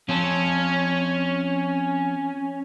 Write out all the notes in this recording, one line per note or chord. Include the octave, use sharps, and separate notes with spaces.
F3 C4 C#4 A5